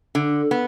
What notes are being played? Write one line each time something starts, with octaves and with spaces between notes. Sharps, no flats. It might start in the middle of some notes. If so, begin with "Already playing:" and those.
D3
B3